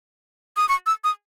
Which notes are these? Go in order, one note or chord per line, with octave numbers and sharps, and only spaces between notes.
D#6
C#6
E6
D#6